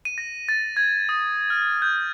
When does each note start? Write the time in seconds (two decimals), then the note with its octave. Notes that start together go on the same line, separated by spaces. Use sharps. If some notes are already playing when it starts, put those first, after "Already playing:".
0.05 D#7
0.18 A#6
0.49 A6
0.77 G#6
1.09 D#6
1.50 F6
1.82 G6